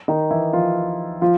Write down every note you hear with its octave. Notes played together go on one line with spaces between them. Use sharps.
D#3 D#4
E3 E4
F3 F4
F3 F4